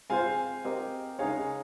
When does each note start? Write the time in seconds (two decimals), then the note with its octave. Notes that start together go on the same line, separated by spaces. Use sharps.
0.10 G#3 C4 F4 C5 F5 G#5
0.65 C4 G4 A#4 D#5
1.19 C#3 G#3 D#4 G#4 C#5 F5 G#5